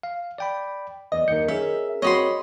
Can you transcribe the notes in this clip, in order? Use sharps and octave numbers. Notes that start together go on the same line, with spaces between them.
F5
D5 G5 B5
E2 D5 D#5
D#2 D#3 G6 C#7
C#4 G#4 A#4 E5
C4 F#4 C#5 D#5 B5 C6